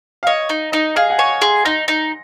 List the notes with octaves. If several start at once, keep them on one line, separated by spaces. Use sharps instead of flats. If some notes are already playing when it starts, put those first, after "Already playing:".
F5
C#5 D#5
D#4
D#4 D#5
G#4 F5
F#5
C#5 G#5
G#4 C6
D#4 A#6
D#4